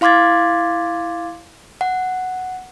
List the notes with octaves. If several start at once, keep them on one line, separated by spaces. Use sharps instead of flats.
E4 F5 C6 D6 G#6 A6
F#5